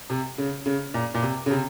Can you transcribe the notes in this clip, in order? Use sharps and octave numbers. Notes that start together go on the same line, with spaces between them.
C3
C#3
C#3
A#2
A#2
C3
C#3
C3